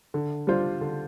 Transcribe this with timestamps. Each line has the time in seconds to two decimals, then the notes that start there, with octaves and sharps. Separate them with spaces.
0.14 D3
0.47 G3 D4 F4 C5
0.81 D3